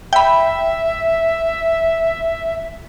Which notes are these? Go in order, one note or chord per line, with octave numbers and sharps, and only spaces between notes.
E5 G5 B5